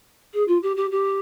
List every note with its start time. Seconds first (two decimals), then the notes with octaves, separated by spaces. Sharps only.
0.33 G#4
0.48 F4
0.63 G4
0.76 G4
0.91 G4